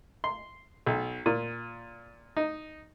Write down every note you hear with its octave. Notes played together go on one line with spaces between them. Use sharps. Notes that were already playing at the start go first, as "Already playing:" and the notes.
C6
B1
A#2
D#4